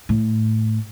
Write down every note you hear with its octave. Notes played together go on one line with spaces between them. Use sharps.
A2